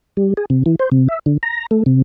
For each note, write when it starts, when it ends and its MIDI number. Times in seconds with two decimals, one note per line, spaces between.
0.17 0.34 55
0.37 0.45 68
0.50 0.63 48
0.66 0.76 52
0.80 0.89 72
0.92 1.08 48
1.08 1.19 76
1.26 1.37 50
1.43 1.66 82
1.71 1.83 57
1.86 2.02 48